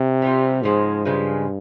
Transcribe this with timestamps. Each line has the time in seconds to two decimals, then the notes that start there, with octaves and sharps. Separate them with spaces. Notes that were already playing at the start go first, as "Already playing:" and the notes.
Already playing: C3
0.22 G3 C4 F4
0.63 G#2 C#3 F3 G#3
1.05 G2 C#3 F3 G#3